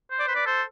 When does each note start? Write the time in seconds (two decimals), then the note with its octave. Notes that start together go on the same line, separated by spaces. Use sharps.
0.11 C5
0.19 D5
0.27 B4 C5
0.35 D5
0.46 A4 C5